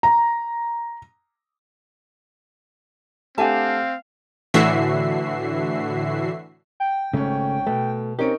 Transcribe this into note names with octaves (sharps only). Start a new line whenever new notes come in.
A#5
A3 C4 D4 G4 F5 F#5 G#5 A5
A2 D3 E3 F#4 E5 C7
G5
G#1 C#3 A3 C#4
B2 A3
C4 C#4 D#4 G4 A#4 C#6 D7